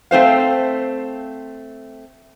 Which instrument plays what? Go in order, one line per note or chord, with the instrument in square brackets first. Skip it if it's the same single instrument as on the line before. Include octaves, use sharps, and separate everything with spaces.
[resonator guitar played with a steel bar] A3 C4 C5 F5